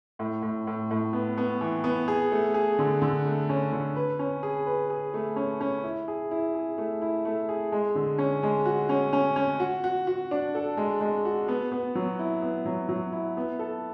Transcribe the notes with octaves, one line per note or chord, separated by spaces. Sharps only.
A2
A2
A2
A2
B3
B3
E3
B3
G#4
A3
G#4
D3
D3
A3
C#4
D3
B4
C#4
G#4
B4
G#4
A3
C#4
C#4
E4
G#4
E4
G#4
A3
E4
A3
G#4
G#3
D3
C#4
G#3
F#4
C#4
C#4
C#4
F#4
F#4
F#4
D4
A4
G#3
G#3
F#4
B3
B3
F#3
E4
B3
F#3
F#3
E4
B3
A4